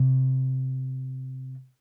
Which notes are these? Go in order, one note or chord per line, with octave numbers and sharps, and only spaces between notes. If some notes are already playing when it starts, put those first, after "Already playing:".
Already playing: C3